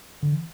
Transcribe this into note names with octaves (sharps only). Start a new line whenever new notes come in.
D3
E3